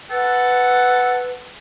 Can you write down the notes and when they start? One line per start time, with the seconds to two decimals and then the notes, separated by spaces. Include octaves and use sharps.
0.11 A4 B4 F#5